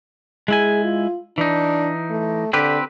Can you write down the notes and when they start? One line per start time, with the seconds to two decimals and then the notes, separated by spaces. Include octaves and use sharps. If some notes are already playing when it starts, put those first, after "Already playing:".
0.48 G#3 E4 G#4 G#5
0.84 F4
1.38 E3 D4 D#4
2.10 A3
2.53 D3 C4 G4 B4